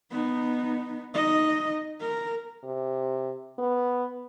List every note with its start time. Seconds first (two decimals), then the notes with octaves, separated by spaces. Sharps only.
0.10 B3 D#4
1.14 D#4 D#5
2.00 A#4
2.64 C3
3.58 B3